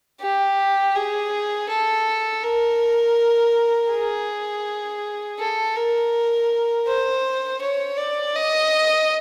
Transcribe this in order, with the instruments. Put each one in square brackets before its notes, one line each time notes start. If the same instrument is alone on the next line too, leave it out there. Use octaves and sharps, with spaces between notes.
[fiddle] G4
G#4
A4
A#4
G#4
A4
A#4
C5
C#5
D5
D#5